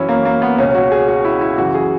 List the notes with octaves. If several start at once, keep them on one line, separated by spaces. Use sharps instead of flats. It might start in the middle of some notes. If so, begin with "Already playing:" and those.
Already playing: F#2 E3 C#4 E4 F#4
A#3
A#3
B3
C#2 B2 C#4
F#4
G#4
F#4
E4
E4
F#2 C#3 E3 F#4
G#4